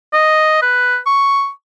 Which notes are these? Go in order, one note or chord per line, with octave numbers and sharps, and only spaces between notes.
D#5
B4
C#6